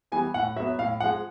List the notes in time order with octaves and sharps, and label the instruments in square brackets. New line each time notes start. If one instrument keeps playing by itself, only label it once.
[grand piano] E3 G3 B3 G#5
A2 F#5
F#3 E5
B3
A2 F5
F3 G#3 F#5